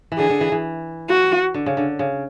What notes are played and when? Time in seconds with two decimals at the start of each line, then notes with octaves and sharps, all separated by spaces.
0.12 E3
0.18 D3 G#4
0.30 D3
0.41 E3
0.52 E3
1.09 F#4
1.54 D3
1.66 C#3
1.77 D3
1.99 C#3